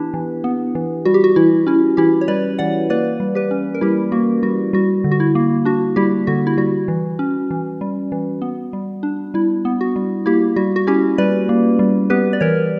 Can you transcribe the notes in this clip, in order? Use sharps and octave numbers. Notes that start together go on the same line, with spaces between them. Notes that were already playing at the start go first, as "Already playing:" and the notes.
Already playing: E3 B3 D4 E4 G4 B4
E3
B3
E3
G3 F#4
G4
F#4
E3 E4
C#4 E4
E3 E4 G4
C#5
G3 B4 D5
E3 D5 F#5
A#3 B4 D5
G3
G4 B4
C#4
A#4
G3 E4 G4
A#3 F#4
G3 F#4
G3 F#4
D3
F#4
E4
A#3
D4 F#4
G3 E4 G4
D3 F#4
E4
G3 F#4
E3
C#4
E3
G3
E3
B3
G3
D4
G3 E4
B3
F#4
G3
A#3 E4 G4
G3 F#4
F#4
C#4 E4 G4
G3 B4 D5
A#3
G3
B3 G4 B4
D5
E3 A#4 C#5